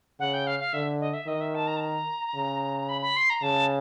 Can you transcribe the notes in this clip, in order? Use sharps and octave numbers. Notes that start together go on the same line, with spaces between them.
C#3 F#5
G5
F5
F5
D3 E5
D#5
E5
D#3 D#5
E5
A5
A#5
A5
A#5
C#3
B5
B5
C6
A#5
C#3 A5